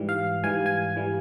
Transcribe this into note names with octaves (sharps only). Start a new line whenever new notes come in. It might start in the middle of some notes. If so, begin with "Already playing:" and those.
Already playing: G#2 E3 G3
F5
G#2 E3 G3 G#5
G#5
E3 G3